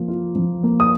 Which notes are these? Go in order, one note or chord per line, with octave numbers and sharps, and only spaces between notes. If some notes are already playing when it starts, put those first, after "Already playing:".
Already playing: F3 A#3
F4
F3
A#3
D#6